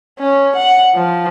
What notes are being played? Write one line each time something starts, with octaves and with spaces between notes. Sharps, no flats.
C#4
F#5
F3